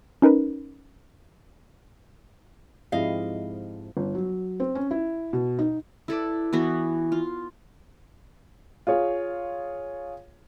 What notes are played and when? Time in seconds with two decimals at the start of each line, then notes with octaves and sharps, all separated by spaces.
0.22 C#4 D#4 A#4 B4
2.92 G#2 F3 G#3 C4 E4 G4 D#5 F5
3.97 G1
4.15 F#3
4.60 C4
4.75 C#4
4.91 E4
5.33 B2
5.59 D#4
6.08 E4 A4 B4 D5
6.53 E3 B3 F#4 B4
7.12 F4
8.87 F4 G#4 C#5